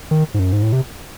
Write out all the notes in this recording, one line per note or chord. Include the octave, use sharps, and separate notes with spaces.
D#3
G#2
F#2
G#2
A2
C3